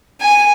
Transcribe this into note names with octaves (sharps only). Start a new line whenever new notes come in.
G#5